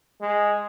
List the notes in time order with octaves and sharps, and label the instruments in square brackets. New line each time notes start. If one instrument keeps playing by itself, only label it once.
[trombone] G#3